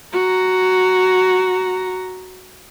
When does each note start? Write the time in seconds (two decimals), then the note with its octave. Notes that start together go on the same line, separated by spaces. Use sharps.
0.13 F#4 A#5